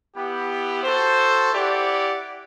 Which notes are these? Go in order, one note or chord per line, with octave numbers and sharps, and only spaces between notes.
B3 E4 G4
F#4 A4 C5
E4 G4 D5 F#5